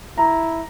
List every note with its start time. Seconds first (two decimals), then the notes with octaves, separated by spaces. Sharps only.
0.18 E4 A#5